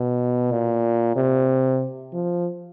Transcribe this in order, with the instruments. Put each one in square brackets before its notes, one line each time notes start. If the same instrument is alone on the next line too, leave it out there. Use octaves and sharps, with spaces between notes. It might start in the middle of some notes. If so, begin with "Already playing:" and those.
Already playing: [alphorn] B2
A#2
C3
F3